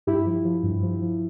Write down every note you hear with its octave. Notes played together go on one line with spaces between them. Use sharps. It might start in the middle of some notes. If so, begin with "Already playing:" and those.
G2 E4 G4
F3
F3
G2
F3
F3